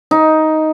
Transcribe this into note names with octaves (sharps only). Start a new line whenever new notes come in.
D#4